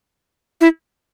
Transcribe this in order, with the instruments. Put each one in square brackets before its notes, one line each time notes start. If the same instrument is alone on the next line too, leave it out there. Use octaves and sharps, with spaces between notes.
[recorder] E4